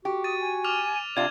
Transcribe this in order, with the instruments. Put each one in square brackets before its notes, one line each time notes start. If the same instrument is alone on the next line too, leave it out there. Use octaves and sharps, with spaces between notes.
[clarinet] F#4 [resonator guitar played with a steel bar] G4
[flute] D#6 [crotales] A6 D#7
[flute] G#5
[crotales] D6 F6 F7
[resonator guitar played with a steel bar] C3 F4 [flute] D4 [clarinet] D5 [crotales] G#6